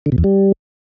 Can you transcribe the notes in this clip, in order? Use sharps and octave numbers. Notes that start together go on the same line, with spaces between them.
D3
B2
E2
G3